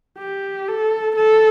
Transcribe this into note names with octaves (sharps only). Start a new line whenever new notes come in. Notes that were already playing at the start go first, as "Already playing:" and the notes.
G4
A4
A4